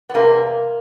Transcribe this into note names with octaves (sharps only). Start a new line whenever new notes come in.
B3
E2 C3 G3 A#3